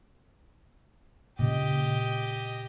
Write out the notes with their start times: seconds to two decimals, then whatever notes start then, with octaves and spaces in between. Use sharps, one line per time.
1.39 A#2 C#3 G4 D#5